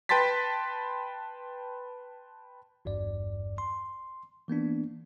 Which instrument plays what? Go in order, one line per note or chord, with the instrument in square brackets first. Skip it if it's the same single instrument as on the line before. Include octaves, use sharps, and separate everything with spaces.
[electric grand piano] B4 G5 A5 C6 A6 B6
[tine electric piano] G#1 E2 G2 D5
C6
E3 A#3 B3 D4